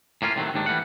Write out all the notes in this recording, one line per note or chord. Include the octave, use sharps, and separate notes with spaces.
A2 A#3 C#4 F4
A2 C3 D#3 F#3 A3
D#2 G#2 D#3 D4
E3 G3 A3 F#5